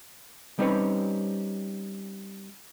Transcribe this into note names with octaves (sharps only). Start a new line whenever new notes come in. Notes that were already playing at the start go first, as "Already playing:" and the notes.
G3 C4 C#4 D#4 B4 C#5